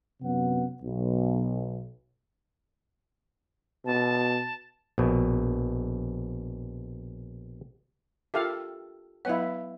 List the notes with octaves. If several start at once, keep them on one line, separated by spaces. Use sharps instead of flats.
F#2 C3 F#3 B3 F#5
B1
B2 A5
A#1 B2
F4 G4 A4 A#4 E5 F5 D6
F#3 B3 E4 B4 C#5 D#5 F5 F#5